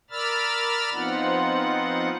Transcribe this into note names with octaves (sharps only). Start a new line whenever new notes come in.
A#4 D5 B5 E6 F6 A6
F3 B3 C4 D#4 F4 F#5